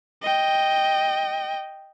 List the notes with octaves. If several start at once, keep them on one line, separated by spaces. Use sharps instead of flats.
D#5 G5